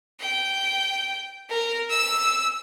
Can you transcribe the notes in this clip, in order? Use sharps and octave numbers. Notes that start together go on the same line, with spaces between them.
G5
A#4
E6